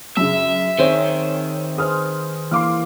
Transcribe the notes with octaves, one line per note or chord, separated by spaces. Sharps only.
F#2 C#3 E5
D#3 C4 G#4 C5 C#5
G#4 B4 C5 D#6 F6
E3 A#3 F5 C6 D6 F6